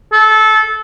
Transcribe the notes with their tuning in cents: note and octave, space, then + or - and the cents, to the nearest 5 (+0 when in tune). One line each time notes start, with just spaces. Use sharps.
A4 -20